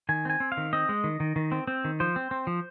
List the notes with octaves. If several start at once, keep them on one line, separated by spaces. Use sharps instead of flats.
D#3 G#5
C4 G#5
C4
F5
D#3
C4 D#5
G#3
D#3
D#3
D#3
C4
C4
D#3
F3 C5
C4
C4
F3